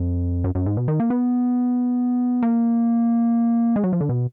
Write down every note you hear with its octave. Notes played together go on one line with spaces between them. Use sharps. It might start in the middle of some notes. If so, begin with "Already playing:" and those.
Already playing: F2
F#2
F#2
G#2
B2
D#3
A#3
B3
A#3
G#3
F#3
F3
D3
B2